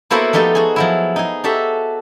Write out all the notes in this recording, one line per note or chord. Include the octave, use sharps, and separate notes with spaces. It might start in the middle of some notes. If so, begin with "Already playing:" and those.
A#3 B3 E4 F#4 A4 C5
F3 A3 D#4 G4 A4
F#4 G#4
F3 F#3 E4
D#4 G#4
F#4 G4 A4 E5